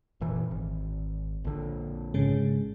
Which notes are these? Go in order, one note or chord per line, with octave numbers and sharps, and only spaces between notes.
F1 A#2 E3
G#1
A#1 D3
G#2 C#3 G#3